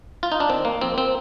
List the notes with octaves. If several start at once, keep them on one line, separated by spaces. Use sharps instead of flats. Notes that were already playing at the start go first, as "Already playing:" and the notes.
F4
D#4
D4
D#3 C4
A#3
F2 C4
C4